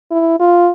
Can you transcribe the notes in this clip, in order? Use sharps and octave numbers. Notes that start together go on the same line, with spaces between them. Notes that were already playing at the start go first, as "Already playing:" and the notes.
E4
F4